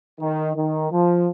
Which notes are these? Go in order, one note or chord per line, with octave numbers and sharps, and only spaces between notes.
D#3
D#3
F3